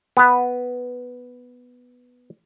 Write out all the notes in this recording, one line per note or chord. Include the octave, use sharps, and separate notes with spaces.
B3 B4